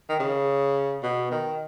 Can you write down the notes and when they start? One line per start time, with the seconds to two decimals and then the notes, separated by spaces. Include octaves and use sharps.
0.09 D#3
0.19 C#3
1.03 B2
1.31 D#3